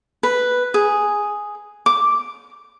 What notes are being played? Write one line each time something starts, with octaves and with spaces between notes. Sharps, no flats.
B4
G#4
D6